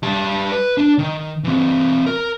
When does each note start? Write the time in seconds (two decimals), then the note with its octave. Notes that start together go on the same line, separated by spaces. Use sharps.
0.03 G3 A5
0.51 B4
0.78 D4
0.98 D#3
1.44 E3 C4
2.06 A#4